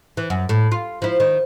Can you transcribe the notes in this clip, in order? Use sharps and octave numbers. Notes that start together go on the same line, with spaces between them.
E3
F#2
A2
F4
F3 E4
D#3